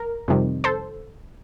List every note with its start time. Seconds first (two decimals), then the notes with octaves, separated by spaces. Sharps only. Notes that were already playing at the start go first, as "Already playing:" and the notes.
Already playing: A#4
0.28 F2 C3 D#3 G3
0.64 A4 C5